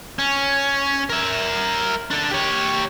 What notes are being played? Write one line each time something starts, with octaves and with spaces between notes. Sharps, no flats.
C#4
A#4 E5
D4 A4
G4 C#5